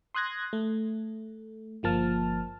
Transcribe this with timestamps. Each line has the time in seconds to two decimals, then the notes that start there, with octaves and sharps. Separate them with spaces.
0.15 C6 D#6 F#6 G#6 A#6
0.53 A3
1.83 G1 F3 A#3 A5 F6